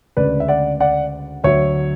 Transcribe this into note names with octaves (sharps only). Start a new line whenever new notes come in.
D2 C#3 G#3 B4 D5
E5
D5 F#5
D5 F#5
D2 D3 F#3 C#5 E5